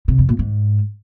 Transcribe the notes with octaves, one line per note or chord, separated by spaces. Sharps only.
C3
F2
A#2
G#2